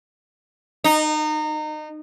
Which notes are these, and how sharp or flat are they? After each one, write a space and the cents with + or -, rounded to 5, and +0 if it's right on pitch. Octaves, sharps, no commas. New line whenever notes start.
D#4 -25